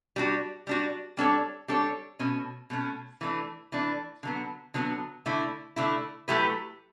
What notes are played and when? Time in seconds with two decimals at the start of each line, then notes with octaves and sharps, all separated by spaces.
0.16 G3 D4 F#4
0.67 G3 D4 F#4
1.17 G3 D4 A4 C#5
1.68 G3 D4 A4 C#5
2.19 B2 A3 C#4
2.70 B2 A3 C#4
3.21 E3 A3 D4
3.72 E3 A3 D4
4.23 D3 F#3 B3
4.74 D3 F#3 B3
5.26 D3 A3 E4
5.76 D3 A3 E4
6.28 F#3 A3 E4 G4 B4